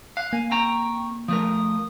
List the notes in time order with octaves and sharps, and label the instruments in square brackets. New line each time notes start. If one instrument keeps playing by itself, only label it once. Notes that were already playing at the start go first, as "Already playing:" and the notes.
[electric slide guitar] F5 [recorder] F#6
[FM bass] A#3 [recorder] G#5
[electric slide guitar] C4 G5 A#5 [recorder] C#6
[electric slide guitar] F3 A3 A#4 [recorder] D#6